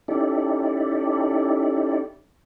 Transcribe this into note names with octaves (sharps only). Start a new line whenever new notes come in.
C#4 D#4 E4 G4 A4 D5